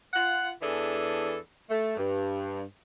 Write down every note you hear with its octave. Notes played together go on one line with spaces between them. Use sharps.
F4 F#5
E2 E3 D4 G#4 A4
A3
G2